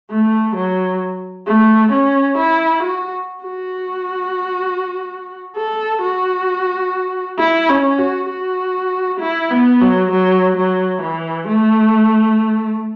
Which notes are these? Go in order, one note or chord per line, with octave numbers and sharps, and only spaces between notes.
A3
F#3
A3
C#4
E4
F#4
F#4
A4
F#4
E4
C#4
F#4
F#4
E4
B3
F#3
F#3
F#3
E3
A3